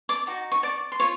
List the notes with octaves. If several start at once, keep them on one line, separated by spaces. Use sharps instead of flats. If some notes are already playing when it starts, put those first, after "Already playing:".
D5 D6
D#4 F#4
C#6
D5 D6
C6
F4 C#5 C#6